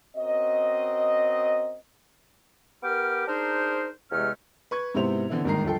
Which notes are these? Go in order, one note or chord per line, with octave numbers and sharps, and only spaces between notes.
C4 C#4 F#4 A#4 D#5
B3 G4 A#4 G5 D6 F6
D4 D#4 G#4 A#4 C5
E2 C3 G#3 A3 C#4 F6
B4 C#6 G#6
G#2 C3 B3 E4 C5 F7
D3 E3 B3 C4 E4
G1 D#2 G#2 D#3 A#5 C7
G1 F3 A4 G5